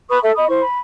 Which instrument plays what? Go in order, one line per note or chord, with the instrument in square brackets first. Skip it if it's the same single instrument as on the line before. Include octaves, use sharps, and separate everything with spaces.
[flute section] B4 B5 C#6 D#6
A4 E5
D#5 B5 D#6
E4 C5 C#6
B5